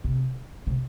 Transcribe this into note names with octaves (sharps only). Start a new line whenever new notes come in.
C3
C3